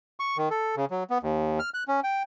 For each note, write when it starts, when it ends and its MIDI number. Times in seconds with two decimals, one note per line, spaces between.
0.20 0.37 85
0.37 0.49 51
0.50 0.75 69
0.76 0.85 49
0.91 1.04 54
1.10 1.18 59
1.23 1.59 39
1.60 1.70 89
1.74 1.84 90
1.88 2.00 61
2.04 2.23 79